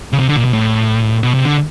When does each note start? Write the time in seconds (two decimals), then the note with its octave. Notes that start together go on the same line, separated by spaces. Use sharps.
0.13 C#3
0.19 C3
0.28 D3
0.37 A#2
0.45 B2
0.53 A2
1.23 B2
1.34 C3
1.45 D3